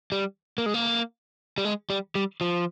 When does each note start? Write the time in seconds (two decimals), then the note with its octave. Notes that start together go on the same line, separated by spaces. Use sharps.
0.12 G3
0.58 A#3
0.66 G#3
0.74 A#3
1.58 G3
1.65 G#3
1.90 G3
2.15 G3
2.41 F3